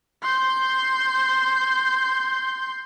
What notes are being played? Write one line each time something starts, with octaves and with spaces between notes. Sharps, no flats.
C6 G6